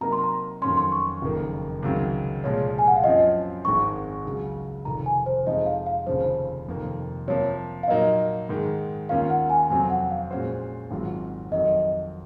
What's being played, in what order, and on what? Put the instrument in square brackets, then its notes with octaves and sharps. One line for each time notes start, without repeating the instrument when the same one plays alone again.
[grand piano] C3 F#3 A#3 D#4 A#4 [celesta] A#5
[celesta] C6
A#5
[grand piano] F2 D#3 F#3 C#4 [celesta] C6
[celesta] C6
C#6
[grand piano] F#1 F2 D#3 A#3
C#2 C3 D#3 F#3 C4
[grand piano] C2 A#2 F3 G#3 [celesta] C#5
[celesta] G#5
F#5
F5
[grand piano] F#2 F3 C4 F4 [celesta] D#5
[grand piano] G#1 G#2 D#3 G#3 C4 [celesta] C#6
[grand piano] C#2 C#3 F#3
[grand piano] F1 F2 D#3 [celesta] A#5
[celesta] G#5
C5
[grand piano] F2 C3 F3 G#3 D#4 [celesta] D#5
[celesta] F5
F5
[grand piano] F1 D#2 C#3 F3 [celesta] C5
[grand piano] F1 F2 D#3 A#3
[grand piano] C3 F3 A#3 [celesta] C#5
[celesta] F5
[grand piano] A#2 F#3 A#3 D#4 [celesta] D#5
[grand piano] G#2 D#3 G#3
[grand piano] D#2 D#3 A#3 C#4 F4 [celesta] F5
[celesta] F#5
G#5
[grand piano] F2 C3 F#3 C4 [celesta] G#5
[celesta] F#5
F5
[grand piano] A#2 G#3 C#4 F#4 C5
G#1 G#2 F#3 C4 F4
[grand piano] F2 D#3 F#3 C4 [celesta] D#5